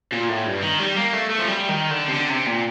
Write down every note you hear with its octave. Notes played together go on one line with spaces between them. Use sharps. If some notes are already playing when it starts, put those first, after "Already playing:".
A#2
A2
G2
D#3
G3
A#3
A3
A3
F3
G3
D#3
D3
C3
D3
C3
A#2